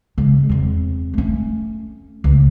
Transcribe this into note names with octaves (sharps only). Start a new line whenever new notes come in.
C#3 G#3
E2 C4
A3 C#4
C#2